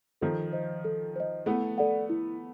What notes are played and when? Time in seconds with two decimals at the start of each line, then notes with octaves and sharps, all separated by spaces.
0.21 D#3 F3 A4
0.53 C5 D#5
0.85 A4
1.16 C5 D#5
1.46 A3 B3 E4
1.78 A4 D5 F#5
2.09 E4